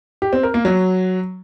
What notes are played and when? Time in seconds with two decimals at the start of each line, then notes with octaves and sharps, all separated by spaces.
0.22 G4
0.33 C4
0.43 A#4
0.54 A#3
0.65 F#3